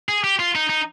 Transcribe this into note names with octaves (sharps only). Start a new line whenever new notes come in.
G#4
G4
F4
D#4
D#4